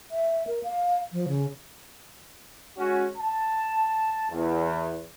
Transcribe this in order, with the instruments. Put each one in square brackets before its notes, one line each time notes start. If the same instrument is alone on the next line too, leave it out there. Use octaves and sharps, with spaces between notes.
[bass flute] E5
A#4
F5
F3
C#3
[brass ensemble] G#3 C#4 F#4
A5
E2